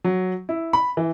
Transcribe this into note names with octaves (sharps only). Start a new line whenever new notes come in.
F#3
E4
B5
E3